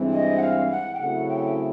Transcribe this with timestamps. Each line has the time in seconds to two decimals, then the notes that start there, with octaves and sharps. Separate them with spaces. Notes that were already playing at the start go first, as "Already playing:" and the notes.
Already playing: G2 E3 G#3 C4 E4
0.13 D#5
0.37 F#5
0.42 F5
0.71 F#5
0.94 G5
1.00 C#3 F#3 A3 C4 E4 F#5
1.29 G5